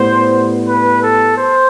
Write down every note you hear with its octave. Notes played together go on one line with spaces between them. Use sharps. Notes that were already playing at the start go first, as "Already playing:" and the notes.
Already playing: A2 G3 B3 C5
B4
A4
C5